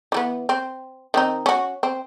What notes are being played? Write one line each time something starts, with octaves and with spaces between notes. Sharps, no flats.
E3 G3 B3
C4
D#3 C4 D#4
C#4 F#4
C4